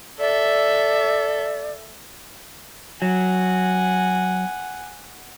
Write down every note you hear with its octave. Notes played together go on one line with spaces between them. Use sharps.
A4 D5 E5
F#3 F#5 G#5